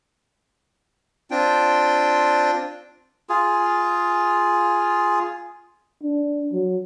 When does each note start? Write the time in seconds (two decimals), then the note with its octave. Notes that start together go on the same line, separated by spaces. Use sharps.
1.31 C4 D4 F4 G5
3.29 F4 G#4
6.03 D4
6.52 F#3